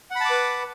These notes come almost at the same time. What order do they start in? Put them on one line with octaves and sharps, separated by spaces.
F#5 B5 A5 D6 B4